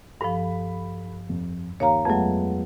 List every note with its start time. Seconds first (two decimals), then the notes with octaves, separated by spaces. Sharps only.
0.21 G2 F3 A4 B5
1.29 F2
1.80 D#2 C#5 F5 A#5
2.05 F2 F#3 G#3 A3 B3